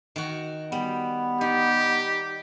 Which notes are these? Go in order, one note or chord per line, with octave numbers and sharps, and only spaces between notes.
D#3 F#4
G3 B3
D#4 G4